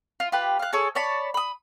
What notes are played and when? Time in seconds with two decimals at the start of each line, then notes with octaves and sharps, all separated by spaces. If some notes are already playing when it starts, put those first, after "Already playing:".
0.20 F4
0.32 F4 G4 B4
0.59 F5 F#6
0.73 G#4 A4 C#5
0.95 C#5 D5 A5 B5
1.34 B5 D#6